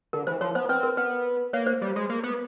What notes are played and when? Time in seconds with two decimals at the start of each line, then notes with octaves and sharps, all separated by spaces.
0.13 D3 A#4
0.27 E3 C5
0.41 F3 C#5
0.55 B3 C5
0.69 C4 B4
0.83 A#4
0.97 B3 B4
1.53 A#3 C#5
1.67 C5
1.81 G3
1.96 G#3
2.09 A#3
2.23 B3